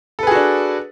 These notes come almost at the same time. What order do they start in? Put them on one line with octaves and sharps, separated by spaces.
A4 B4 G#4 F#4 D4